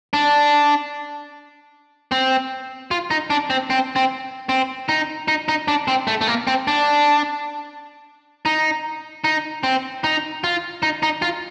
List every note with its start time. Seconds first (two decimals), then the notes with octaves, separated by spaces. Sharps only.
0.13 D4
2.12 C4
2.91 F4
3.11 D#4
3.30 D4
3.50 C4
3.70 C4
3.96 C4
4.49 C4
4.89 D#4
5.28 D#4
5.48 D#4
5.68 D4
5.88 C4
6.07 A3
6.21 A3
6.27 A#3
6.47 C4
6.68 D4
8.45 D#4
9.24 D#4
9.63 C4
10.04 D#4
10.44 F4
10.83 D#4
11.03 D#4
11.22 F4